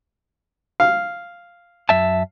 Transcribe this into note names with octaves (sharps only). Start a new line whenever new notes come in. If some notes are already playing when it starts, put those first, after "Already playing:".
F5
F#2 E5 A5